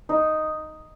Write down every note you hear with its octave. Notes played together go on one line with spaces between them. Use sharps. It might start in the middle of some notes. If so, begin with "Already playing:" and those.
D#4